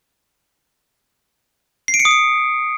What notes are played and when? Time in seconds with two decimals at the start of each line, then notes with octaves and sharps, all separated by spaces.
1.88 C7
1.94 D7
2.00 C#7
2.05 D#6
2.11 C#7